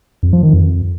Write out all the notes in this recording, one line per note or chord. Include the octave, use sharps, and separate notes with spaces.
F2
F3
D#3
F2